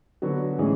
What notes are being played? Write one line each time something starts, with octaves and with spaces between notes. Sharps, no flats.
D3 F#3 B3 F#4
A2 E3 G#3 C#4 G#4